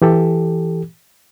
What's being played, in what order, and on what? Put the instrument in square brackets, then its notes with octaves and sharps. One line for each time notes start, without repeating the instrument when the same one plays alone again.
[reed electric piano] E3 G4 A4